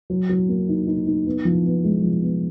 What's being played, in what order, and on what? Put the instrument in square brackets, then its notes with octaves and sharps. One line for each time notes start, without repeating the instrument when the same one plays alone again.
[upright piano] F#3
F#3
A#3
D#4
D#4
D#4
B3
F3
B3
G#3
F3
B3